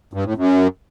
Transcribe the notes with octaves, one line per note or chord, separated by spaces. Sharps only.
G2
A2
F#2